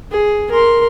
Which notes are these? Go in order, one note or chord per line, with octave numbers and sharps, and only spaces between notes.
G#4
A#4 C6